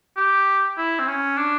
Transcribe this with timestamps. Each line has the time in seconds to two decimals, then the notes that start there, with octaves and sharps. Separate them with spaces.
0.17 G4
0.78 E4
1.00 C4
1.08 C#4
1.38 D4